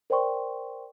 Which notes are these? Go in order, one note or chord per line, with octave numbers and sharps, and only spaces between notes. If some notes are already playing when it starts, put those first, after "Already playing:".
A#4 C5 D5 G5 C6 C#6